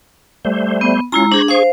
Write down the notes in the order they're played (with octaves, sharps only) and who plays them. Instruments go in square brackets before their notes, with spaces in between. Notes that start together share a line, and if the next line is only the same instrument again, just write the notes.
[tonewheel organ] G3 A3 C5
[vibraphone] B3
[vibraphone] G#3 E4 A#5 [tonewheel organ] C#4 F4
[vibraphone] D4 G#4 [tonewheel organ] C5 C#6 A#6
[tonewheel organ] G#4 C#6 [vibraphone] C5 F5